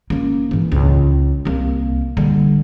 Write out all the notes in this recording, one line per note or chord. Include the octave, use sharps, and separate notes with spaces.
A#3 C#4
G#2 E3
C#2
C2 A#3
D3 G3